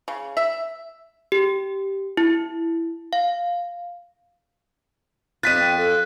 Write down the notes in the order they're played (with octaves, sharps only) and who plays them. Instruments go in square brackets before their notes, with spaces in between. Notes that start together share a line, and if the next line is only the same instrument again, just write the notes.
[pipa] C#3
E5
[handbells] G4
E4
F5
[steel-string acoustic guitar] F2 F4 [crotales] F#6 [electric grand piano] A6 B6 D#7
[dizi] G5
A4